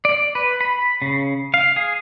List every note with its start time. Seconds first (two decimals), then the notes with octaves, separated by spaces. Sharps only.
0.05 D5
0.35 B4
0.61 B5
1.02 C#3
1.54 F5
1.76 G#4